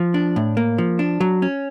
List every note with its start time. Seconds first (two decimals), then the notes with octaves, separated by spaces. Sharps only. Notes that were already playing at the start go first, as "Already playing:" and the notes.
Already playing: F3
0.14 D4
0.36 A2
0.57 A#3
0.78 F3
0.99 D4
1.21 F#3
1.42 C#4